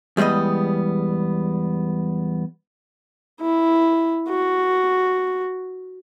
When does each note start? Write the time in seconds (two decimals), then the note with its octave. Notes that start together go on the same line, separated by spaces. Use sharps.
0.17 E2 G3 G#3 B3 D#5
3.41 E4
4.29 F#4